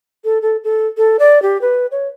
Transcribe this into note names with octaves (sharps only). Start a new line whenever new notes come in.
A4
A4
A4
A4
D5
G4
B4
C#5